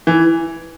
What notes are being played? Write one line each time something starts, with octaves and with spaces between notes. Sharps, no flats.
E3